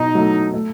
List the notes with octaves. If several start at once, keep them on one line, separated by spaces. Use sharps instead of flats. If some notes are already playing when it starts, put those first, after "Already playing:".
Already playing: B2 F#3 D#4
F#3 A3
A3